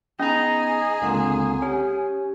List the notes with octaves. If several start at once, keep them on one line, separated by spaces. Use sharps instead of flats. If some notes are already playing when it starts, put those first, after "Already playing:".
B3 C#4 D#4 G#4 D#5 A#5
C#2 D3 A#3 C4 F#5 A#5
C#4 G4 G#5